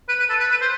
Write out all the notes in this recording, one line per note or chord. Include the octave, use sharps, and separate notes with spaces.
B4
B4
A4
B4
B4
C5